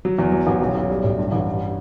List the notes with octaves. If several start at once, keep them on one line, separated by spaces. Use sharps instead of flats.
F#3
E2
F#3
A1
B1
B1
G3
A2
G2
A1
G2